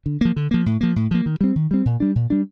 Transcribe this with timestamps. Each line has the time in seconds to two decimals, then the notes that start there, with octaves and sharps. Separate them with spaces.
0.06 D3
0.21 F3 A#3
0.36 D3
0.51 F3 A#3
0.66 A2
0.81 F3 A#3
0.96 A2
1.11 F3 A#3
1.26 D#3
1.41 G3 C4
1.56 D#3
1.71 G3 C4
1.85 A#2
2.00 G3 D4
2.15 A#2
2.30 G3 D4